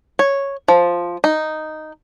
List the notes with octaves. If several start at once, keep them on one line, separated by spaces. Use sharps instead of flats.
C#5
F3
D#4